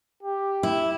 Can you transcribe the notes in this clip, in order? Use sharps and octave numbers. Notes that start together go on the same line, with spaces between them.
G4
E4